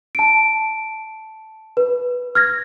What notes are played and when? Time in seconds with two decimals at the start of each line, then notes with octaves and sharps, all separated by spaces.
0.15 A5 D7
1.77 B4
2.35 F6 G#6 A#6